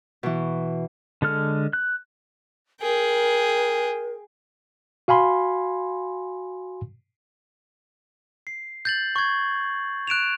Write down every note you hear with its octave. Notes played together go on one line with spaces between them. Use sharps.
B2 E3
D3 G#3 A4 F6
F#6
G#4 A#4 G5
F#4 F5 G#5 B5 C6
C7
G6 A6 F#7
C#6 G#6
F#6 D7 E7 F7